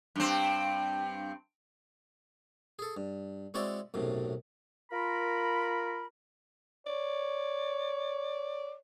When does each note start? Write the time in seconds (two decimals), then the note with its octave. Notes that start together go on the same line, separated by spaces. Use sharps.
0.16 G2 C4
2.79 G#4 A4
2.97 G2
3.54 G#3 C4 E4 F#4 C#5 D5
3.94 B1 F#2 A2 C3
4.92 F4 A#4 B5
6.87 C#5 D5